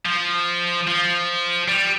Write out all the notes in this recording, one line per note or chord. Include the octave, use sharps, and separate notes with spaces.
F3
F3
G3